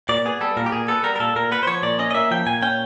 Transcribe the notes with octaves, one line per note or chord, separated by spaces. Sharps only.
A#2 D5
B3 G#4
G3 A4
A#2 A#4
G4
A#2 G#4
B3 A4
G3 A#4
A#4
A#2 A4
A#2 A#4
B3 B4
C5
F3 C#5
A#2 D5
C#4 D#5
D#5
A#3 E5
F3 G5
A#2 G#5
C#4 G5